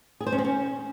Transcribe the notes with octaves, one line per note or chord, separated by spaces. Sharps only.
G#4
C5
C#4
C4
C#4